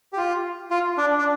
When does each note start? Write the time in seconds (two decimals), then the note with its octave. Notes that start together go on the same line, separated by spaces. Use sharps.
0.13 G4
0.17 F4
0.70 F4
0.98 D4
1.18 D4